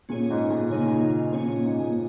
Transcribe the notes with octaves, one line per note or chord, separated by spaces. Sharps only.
A#2 C#4 G#4 C#5
G#2
A#2
A#2
C#3 A#3 D#4 C#5
A#2
C#3
D#3
A#2 C#4 G#4 C#5
A#2
G#2
A#2